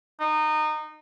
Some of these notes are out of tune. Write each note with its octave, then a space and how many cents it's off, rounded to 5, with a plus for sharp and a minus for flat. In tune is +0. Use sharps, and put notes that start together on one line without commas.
D#4 -20